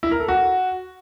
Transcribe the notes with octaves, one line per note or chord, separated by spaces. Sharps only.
E4
A#4
A4
F#4